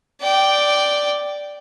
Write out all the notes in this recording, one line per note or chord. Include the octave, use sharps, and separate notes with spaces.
D5 G5